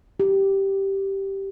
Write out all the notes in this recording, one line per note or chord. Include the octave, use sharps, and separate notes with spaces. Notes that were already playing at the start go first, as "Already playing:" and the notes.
G4